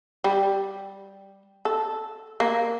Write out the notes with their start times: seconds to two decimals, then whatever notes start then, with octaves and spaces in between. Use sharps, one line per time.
0.24 G3
1.65 A4
2.40 A#3